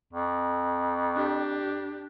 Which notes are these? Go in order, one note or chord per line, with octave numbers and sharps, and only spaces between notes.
F2
D4 G4